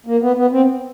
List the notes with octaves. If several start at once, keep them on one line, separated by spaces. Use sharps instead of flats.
A#3
B3
B3
C4